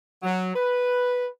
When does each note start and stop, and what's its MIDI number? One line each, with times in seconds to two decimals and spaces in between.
0.23 0.54 54
0.55 1.27 71